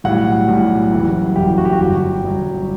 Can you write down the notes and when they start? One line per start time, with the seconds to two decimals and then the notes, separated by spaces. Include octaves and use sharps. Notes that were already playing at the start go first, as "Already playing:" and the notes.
0.04 B1 A2 G3 F#5
0.48 B1 A2 G3
0.92 F#1 F#2 E3 G3
1.36 F#1 F#2 E3 G3 G4
1.58 F#4
1.65 G4
1.73 F#4
1.80 G1 G2 F#3 G4
2.24 G1 G2 F#3